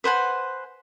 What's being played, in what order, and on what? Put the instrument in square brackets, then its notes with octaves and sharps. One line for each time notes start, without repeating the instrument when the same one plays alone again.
[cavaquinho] B4 C5 F#5 G#5